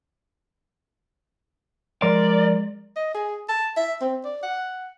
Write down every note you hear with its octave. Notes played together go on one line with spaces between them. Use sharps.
F3 G#3 A#4 D5 C6
D#5
G#4
A5
E5
C4
D5
F#5